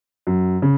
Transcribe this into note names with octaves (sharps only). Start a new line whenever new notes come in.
F#2
C#3